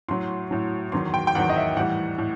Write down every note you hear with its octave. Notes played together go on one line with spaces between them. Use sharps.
A2 F#3 C6
A2 F#3
E2 D#3 F#3 C6
G5
G5
E2 D#3 F#3 F#5
D#5
E5
A2 E3 G3 F#5
A2